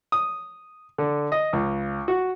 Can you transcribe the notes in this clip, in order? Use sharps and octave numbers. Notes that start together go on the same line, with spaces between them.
D#6
D3
D#5
C#2
F#4